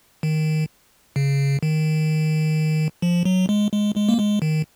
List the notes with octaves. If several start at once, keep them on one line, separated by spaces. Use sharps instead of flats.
D#3
C#3
D#3
F3
F#3
G#3
G#3
G#3
A#3
G#3
D#3